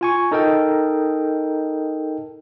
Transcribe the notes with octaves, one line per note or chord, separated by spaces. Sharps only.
F4 G#5 C#6
D#4 A4 A#4 D#5 G5